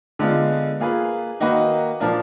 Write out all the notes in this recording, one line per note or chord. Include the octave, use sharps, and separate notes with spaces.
D3 G#3 B3 F4
A#3 F4 G#4 B4
D#3 A#3 D#4 F#4 B4
A#2 F3 A#3 D4 F4